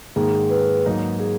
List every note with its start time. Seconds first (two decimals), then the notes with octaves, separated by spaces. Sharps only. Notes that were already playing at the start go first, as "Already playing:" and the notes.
0.16 G#2 D#3 A#3 G#4
0.50 B4
0.85 G#2 F#3 A#3 D#4
1.20 G#4